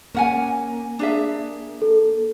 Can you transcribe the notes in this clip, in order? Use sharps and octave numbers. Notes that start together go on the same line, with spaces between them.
A#3 C#4 F#5 G#5
D4 G#4 E5
A4